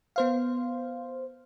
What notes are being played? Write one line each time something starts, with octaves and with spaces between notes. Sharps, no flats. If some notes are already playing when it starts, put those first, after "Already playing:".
B3 C5 F5